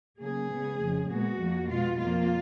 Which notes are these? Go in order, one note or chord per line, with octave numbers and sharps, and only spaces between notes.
C#3 F#3 A#3 G#4
C#3 G#3 B3
F2 C#3 F3
A#2 G#3 B3 F#4
F2 F3 A#3
B2 G#3 B3 F4
F2 F3 A#3 F4